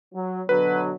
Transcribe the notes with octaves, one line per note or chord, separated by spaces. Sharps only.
F#3
B2 D3 F#3 B4